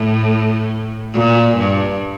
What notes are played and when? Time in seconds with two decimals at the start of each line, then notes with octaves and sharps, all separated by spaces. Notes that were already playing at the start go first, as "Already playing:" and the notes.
Already playing: A2
1.14 A#2
1.58 G2